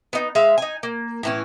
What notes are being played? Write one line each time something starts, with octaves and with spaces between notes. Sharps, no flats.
B3 D#4
G#3 E5 F5
D#4 G#5
A#3
A2 E3 C#4